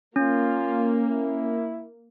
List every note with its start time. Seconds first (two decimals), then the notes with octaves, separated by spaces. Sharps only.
0.16 A#3 C#4 F4
1.10 E4